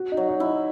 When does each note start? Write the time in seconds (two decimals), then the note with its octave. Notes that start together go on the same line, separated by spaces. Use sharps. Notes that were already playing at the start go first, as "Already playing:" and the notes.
Already playing: F#4
0.12 D#4
0.17 F#3
0.29 D#4
0.40 E4
0.46 D#4